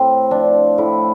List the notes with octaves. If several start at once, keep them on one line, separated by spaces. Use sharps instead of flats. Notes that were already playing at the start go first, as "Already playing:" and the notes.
Already playing: A2 C4
F3 D4
A2 E4